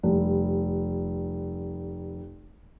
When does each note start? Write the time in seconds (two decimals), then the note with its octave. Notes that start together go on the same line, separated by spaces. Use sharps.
0.03 F1 G3